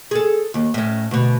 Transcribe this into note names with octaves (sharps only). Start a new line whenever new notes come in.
G#4 A4
D#2
A2 C#4
D2 B2